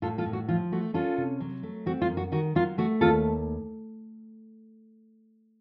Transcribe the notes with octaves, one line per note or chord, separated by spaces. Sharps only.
A2 F4 A4
F4 A4
A2
F#4
F3 F4
A3 F#4
C#4 F4 A4
C3
F#3
A3
C4 F#4
F4
F#2
F#4
D#3 F#4
F#3 F4
A3 F#4
D#2 F4 A4